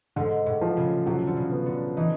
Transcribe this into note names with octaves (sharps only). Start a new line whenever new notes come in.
G#2 D3
A2
F3
C#3
C3 F#3
D3
C#3
B3
D3
E3 D#4